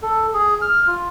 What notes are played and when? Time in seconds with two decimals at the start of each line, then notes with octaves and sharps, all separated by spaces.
0.02 A4
0.34 G#4
0.62 F6
0.87 F4